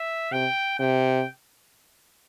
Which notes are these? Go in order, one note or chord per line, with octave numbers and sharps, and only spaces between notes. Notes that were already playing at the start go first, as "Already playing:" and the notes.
Already playing: E5
C3 G5
C3 G5